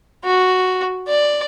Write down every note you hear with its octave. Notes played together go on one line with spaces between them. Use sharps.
F#4
D5